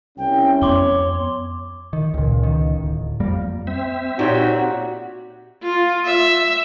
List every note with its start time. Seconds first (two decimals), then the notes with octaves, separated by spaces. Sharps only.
0.18 C2 C#4 G5
0.62 F2 B3 C#5 C6 D6 G7
1.93 D#3
2.14 C#2 A#2
2.43 C#2 D#3
2.76 D1
3.20 F2 G3 A#3
3.67 C4 E5
4.19 A#2 D#4 F#4 G4 C#5
5.63 F4
6.05 E5